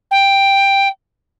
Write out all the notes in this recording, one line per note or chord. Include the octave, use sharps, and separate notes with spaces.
G5